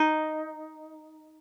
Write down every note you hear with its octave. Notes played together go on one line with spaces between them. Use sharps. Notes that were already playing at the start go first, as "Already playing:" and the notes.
Already playing: D#4